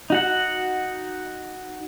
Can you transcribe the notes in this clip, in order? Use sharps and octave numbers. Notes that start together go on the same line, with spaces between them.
D#4 F#4 F#5